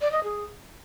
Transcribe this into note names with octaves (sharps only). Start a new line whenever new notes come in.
D5
D#5
G#4